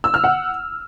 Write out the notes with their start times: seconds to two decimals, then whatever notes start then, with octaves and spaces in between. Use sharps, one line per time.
0.04 E6
0.14 F6
0.24 F#5